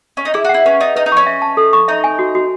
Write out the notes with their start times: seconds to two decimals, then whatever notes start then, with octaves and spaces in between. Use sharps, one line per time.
0.17 C#4
0.25 D#4
0.34 E4 G#4
0.45 F#4
0.49 E4 F#5
0.66 C#4 B4
0.81 D#4 D#5
0.96 D#4 B4
1.06 D#4
1.12 C#4 C#6
1.27 E5
1.42 A5
1.57 A4
1.73 C#6
1.88 D#4 E5
2.04 G#5
2.19 F#4
2.35 F#4